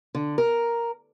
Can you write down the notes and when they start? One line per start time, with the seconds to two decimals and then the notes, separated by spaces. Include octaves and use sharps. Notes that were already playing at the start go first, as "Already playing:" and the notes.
0.15 D3
0.38 A#4